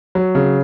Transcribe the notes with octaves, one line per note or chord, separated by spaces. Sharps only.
F#3
C#3